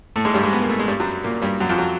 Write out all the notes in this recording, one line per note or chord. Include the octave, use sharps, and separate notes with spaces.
A2 A3
G#2 G#3
G2 G3
G#2 G#3
B3
A#3
A3
G#3
G2 G3
F#2 F#3
A#2 A#3
G2 G3
F#2 F#3
F2 F3
F#3